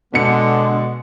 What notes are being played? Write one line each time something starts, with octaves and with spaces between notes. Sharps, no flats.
B2 D3 G#3 B3 C#7